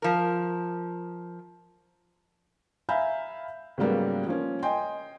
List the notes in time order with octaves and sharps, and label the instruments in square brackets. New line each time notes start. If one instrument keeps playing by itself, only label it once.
[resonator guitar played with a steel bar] F3 A#4
[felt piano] E5 F5 G#5 A#5 B5 G6
G#2 C#3 F#3 G3 A#3 B3
F3 A#3 C#4
D#5 G5 G#5 C6